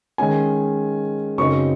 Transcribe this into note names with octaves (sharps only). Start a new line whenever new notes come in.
D#3 G#3 C#4 G#5
F#2 C#3 F#3 C4 D#4 C#6